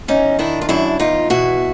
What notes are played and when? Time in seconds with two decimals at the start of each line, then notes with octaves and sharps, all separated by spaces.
0.08 E2 C#4 D#4
0.39 D#3 D4 E4
0.61 F4
0.69 F#2 D4 E4
0.99 E2 D#4 F4
1.30 B2 E4 F#4